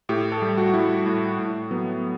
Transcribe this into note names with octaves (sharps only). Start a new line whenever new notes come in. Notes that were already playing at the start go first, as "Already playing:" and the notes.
A2 G4
A4
G3 G4
F#4
G3 E4
A2
A2
F#3 B3